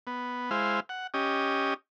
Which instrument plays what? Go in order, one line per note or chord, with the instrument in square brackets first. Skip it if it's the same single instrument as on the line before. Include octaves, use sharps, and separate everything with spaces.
[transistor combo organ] B3
G#3 E4 C5 F5
F#5
C#4 G4 D#5